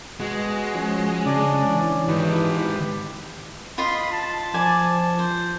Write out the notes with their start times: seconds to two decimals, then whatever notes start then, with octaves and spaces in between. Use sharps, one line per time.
0.20 B2 G#3 F#4 F#6
0.74 F3 C#4
1.26 C#3 D4 D5
1.68 E3
2.08 B2 D#3 G#3 G4 B4 G5
3.78 F4 D#5 B5 C6
4.12 A5
4.54 F3 D5 G#5
5.19 C5